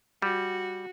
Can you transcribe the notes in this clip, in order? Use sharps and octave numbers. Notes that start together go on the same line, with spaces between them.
G3 F#4